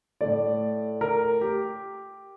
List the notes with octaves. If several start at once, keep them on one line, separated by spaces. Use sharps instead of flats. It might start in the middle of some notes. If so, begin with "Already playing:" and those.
A2 A3 D5
A#4
G4